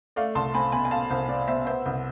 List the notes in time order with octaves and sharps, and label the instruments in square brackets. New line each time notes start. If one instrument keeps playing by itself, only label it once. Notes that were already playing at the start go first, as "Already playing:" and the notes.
[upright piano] A3 D5 F5
C2 A5 C6
C4 G#5 B5
B2 G#5 B5
G#5
A3 F5 A5
C2 C5
C4 D5
B2 C5 E5
B3 C5 E5
C2